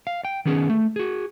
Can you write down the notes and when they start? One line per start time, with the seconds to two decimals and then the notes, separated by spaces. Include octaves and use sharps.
0.07 F5
0.25 G5
0.45 D#3 B3 C#4 G#4
0.70 A3
0.96 F#4 G#4